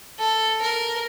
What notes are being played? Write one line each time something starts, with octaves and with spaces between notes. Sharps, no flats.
A4
A#4